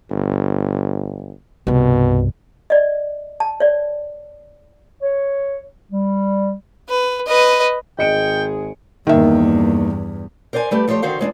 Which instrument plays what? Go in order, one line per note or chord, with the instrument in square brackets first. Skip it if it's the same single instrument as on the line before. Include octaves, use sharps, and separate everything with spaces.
[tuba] G1
[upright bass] C2 G2 [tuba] B2
[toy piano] D5 D#5
A5
C#5 D5
[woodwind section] C#5
G3
[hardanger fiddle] B4
B4 D#5
[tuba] G#1 [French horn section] G#2 G#3 G#4 [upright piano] D#5 C#7 D7 [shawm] G5
[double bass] E2 G2 [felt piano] D#3 E5 [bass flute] A#3
[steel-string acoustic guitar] A#4 C5 D5 F5 G#5
G3 A3 G4 B4
F3 A3 G4 C5 C#5
D3 D#3 F#4 C5 F5
E2 G#3 C4 D4